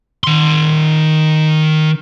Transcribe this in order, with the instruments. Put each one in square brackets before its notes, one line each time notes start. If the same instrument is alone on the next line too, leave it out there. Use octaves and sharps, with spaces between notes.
[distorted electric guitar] D#3 C6